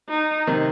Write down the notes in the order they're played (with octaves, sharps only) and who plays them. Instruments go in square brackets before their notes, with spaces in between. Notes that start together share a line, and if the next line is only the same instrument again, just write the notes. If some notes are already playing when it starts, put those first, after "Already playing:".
[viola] D#4
[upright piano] C3 D#3